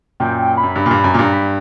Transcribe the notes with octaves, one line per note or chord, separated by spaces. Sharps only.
F#2 A#2 G5
G5
B5
F#2
G2
A#2
G2
F#2
A#2
G2
A#5
B5